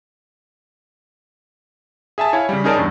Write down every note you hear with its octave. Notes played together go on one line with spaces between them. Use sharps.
G#4 E5 G#5 A5
E4 C#5 F5 G#5
C#3 G3
C#4 D#4 G#4 A#4 D5 A5
E2 G2